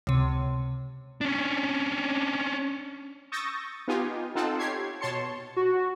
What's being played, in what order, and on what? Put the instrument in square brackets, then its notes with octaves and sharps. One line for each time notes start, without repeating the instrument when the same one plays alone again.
[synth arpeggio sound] C#2 C3
[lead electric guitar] C#4 D4
[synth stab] C#6 D#6 E6 G6 A6 A#6
B3 D#4 F4 G4 G#5
C4 D#4 F4 A4 F#5 A5
G4 C#5 G#6 C7
B2 C#5 A5 C6 C#7
[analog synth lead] F#4